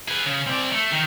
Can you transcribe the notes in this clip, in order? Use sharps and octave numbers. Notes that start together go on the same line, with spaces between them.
G#4 B4
C#3
C4 D5
A3
D#3